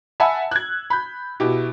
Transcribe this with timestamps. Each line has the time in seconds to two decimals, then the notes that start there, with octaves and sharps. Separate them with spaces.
0.20 E5 F#5 G#5 A5 B5 E6
0.51 F#6 G#6
0.90 B5 G6
1.40 B2 E4 G4